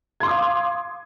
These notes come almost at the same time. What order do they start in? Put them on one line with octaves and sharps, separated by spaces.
G#6 C6 D6 D#6 F5